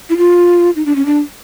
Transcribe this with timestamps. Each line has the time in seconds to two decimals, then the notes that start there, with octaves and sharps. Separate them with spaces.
0.10 E4
0.18 F4
0.76 D#4
0.86 D4
0.96 C#4
1.06 D4